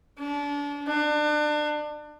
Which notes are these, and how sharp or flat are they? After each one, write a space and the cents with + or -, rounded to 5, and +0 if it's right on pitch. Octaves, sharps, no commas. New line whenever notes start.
D4 -30
D4 +30